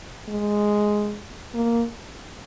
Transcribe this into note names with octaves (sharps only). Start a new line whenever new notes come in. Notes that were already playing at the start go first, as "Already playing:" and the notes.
G#3
A#3